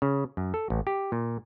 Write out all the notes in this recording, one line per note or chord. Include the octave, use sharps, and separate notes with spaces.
C#3
F#2
A4
A1
G4
A#2